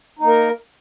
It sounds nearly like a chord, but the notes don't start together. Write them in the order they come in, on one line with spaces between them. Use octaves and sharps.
D#4 A#3 A#4